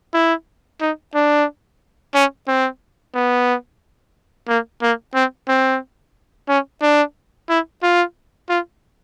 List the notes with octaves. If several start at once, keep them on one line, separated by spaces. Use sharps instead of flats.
E4
D#4
D4
C#4
C4
B3
A#3
A#3
C4
C4
C#4
D4
E4
F4
F4